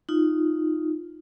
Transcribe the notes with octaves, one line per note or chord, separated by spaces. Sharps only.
D#4 F4